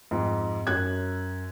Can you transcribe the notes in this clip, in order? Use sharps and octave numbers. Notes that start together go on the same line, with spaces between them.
F2 G#2
F#2 F#6 G#6